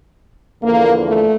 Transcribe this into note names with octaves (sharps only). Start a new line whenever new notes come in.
E2 D3 F3 A#3
A3